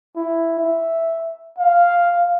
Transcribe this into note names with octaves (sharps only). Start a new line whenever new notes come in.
E4
E5
F5